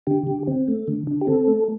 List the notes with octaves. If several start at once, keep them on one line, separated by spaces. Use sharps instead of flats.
D3 G4
D3
C4
A3
D3
D3
G4
C4 A4
A3